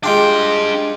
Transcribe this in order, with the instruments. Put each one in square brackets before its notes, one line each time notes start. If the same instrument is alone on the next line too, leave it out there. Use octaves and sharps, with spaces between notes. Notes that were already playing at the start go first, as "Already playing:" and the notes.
[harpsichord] G#3 F4 G4 [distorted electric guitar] D4 G5